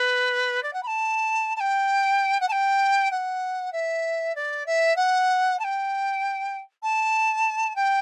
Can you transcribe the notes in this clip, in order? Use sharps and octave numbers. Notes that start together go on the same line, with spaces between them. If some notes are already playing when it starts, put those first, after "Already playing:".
Already playing: B4
D5
F#5
B5
A5
A5
G5
F#5
A5
G5
F#5
E5
D5
E5
F#5
A5
G5
A5
G5